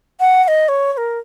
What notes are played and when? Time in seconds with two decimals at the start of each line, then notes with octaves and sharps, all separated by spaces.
0.20 F#5
0.44 F#5
0.48 D#5
0.68 C#5
0.93 C#5
0.97 A#4